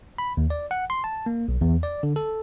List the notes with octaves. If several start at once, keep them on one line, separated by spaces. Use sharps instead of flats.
B5
D#2
D5
F#5
C6
A5
A#3
B1
E2
D5
D3
A4